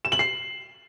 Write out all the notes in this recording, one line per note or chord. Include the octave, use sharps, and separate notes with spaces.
E7
F#7
C7